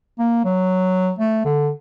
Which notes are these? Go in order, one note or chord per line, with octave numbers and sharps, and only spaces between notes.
A#3
F#3
A3
D3